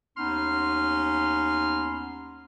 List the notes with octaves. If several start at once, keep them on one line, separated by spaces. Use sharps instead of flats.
D#2 B3 C#4 D#4 C6 F6